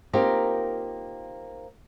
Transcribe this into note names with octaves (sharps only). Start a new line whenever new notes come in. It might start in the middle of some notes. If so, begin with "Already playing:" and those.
A#3 C4 D#4 F4 G4 A#4